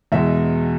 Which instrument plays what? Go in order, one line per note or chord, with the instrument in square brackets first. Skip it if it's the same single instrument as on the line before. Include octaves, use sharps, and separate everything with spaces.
[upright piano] E2 B2 G#3 E5